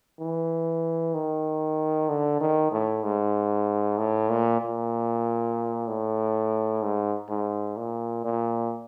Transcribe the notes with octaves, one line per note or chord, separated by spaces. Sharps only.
E3
D#3
D3
D#3
A2
G#2
A2
A#2
A#2
A2
G#2
G#2
A#2
A#2